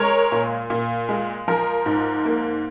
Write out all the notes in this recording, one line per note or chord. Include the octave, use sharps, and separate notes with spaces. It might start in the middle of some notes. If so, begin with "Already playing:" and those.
Already playing: G#3 A#4 C#5
A#2
A#2
G#3
F3 A#4
G#2
A#3